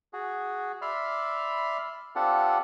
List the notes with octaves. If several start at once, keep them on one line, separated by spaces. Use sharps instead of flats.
F#4 G#4
D5 E5 B5 C6 F6
C4 D4 F4 G4 A4 F#5